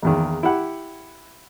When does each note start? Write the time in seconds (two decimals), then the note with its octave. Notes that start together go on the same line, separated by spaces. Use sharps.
0.02 A#1 E2 D#3
0.43 E4 G4 F#5